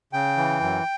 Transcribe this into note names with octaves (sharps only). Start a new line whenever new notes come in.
C#3 G5
E3
F#2